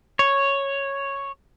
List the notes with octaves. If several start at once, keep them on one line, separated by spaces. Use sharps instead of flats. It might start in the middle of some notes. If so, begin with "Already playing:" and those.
C#5